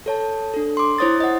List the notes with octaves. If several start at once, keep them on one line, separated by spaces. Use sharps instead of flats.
A4 C#5 A5
D4 A4
C6 D6
E4 C5 C#5 D#6 A6
D#5 F#5